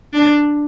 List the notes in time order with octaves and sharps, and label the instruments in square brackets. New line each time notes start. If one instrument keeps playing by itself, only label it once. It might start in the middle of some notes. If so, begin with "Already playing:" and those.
[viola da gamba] D4